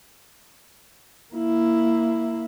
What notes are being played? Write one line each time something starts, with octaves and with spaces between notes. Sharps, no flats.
A#3 E4